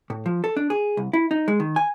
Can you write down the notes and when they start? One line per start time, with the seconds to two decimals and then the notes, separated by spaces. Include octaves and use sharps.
0.10 A2
0.26 F3
0.44 A4
0.57 D4
0.70 G#4
0.97 C2
1.13 E4
1.31 D#4
1.48 G#3
1.60 D#3
1.76 G#5